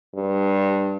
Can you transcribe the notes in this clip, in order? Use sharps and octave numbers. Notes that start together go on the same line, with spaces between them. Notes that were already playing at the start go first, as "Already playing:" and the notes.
G2